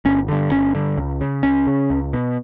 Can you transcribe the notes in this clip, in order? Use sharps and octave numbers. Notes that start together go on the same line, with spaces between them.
G1 C#4
G2 D3
G1 C#4
G2 D3
C#2
C#3
C#2 C#4
C#3
C#2
B2